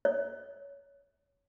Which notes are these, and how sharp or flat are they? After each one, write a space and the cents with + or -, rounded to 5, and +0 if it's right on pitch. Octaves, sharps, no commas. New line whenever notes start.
C#5 +20